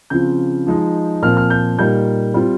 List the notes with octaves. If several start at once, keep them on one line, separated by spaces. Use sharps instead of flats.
C#3 F3 C4 F4 G6
F3 G#3 D#4
A#2 F3 C4 F6
F6
G6
A#2 G3 A#3 D#4 G6
G3 C4 F4